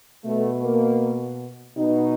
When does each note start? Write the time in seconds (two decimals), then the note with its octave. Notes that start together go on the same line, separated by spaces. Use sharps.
0.24 B2 A3
0.63 A#3
1.77 B2 D#4